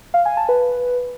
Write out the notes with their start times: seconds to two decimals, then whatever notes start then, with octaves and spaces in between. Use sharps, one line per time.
0.14 F5
0.25 G#5
0.37 A5
0.49 B4